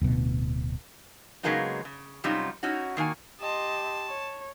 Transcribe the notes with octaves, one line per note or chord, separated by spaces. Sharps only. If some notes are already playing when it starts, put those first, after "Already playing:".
D1 B2
C#3 F#3 G#3 A#3 B3 D#4
C#3
F#2 C3 G3 C#4 D#4 F4
C#4 D#4 E4 F#4
D#3 A#3 F#4 G#5
G4 D#5 A5 C6
C#5